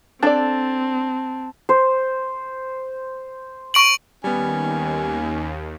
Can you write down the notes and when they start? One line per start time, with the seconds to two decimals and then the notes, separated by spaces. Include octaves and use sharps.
0.22 C4 D4 A4 D5 A5
1.69 C5
3.74 C#6 D7 F#7
4.24 D#2 G3 B3 C#4